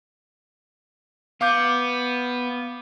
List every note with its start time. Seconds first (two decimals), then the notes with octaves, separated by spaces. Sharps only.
1.41 B3 F5 D6 G6